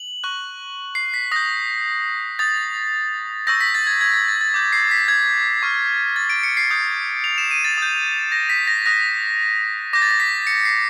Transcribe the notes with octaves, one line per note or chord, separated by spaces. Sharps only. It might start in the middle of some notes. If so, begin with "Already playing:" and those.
Already playing: F#7
C#6 F#6
C7
B6
D#6 G6 A#6
D#6 G6 A6
C#6 E6 G6 A#6
B6
A6
G#6
G#6
A6
A6
A6
D6 G6
C7
B6
G#6
C#6 F6
A6
D7
C#7
C7
D#6 G6
F7
E7
D#7
A6
D#6 G6
A#6
B6
A#6
D#6 F#6 A#6
D6 G6 A#6
A6
A#6
B6
C#7
C7